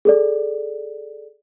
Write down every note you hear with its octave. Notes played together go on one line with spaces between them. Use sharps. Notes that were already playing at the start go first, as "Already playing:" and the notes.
G#4 A4 D5